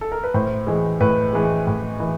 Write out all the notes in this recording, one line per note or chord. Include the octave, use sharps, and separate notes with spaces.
A4
A#4
B4
A2 C5
E3 G#3
A2 B4
E3 G#3
A2
E3